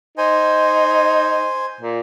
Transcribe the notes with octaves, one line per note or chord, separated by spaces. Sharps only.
D#4 C5 G#5
A#2